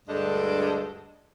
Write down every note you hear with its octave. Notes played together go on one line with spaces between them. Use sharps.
D2 G2 G#3 D4 A4 D#5